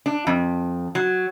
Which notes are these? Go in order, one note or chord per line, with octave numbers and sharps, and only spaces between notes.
D4
F2
F#3